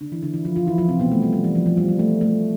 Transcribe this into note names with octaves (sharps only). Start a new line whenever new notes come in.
D3 D4
E3 E4
D3 D4
E3 E4
F3 F4
F3 F4
E3 E4
F3 F4
C3 C4
B2 B3
A3
G3
G3
E3
F3
F3
G3
G3
A3
A3